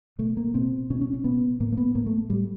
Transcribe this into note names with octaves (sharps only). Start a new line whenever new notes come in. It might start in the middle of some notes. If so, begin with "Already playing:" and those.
B2 A3
A#3
B2 C4
B2 C#4
C#4
C#4
B2 B3
A2 A#3
A#3
B3
A2 A#3
A3
A2 G3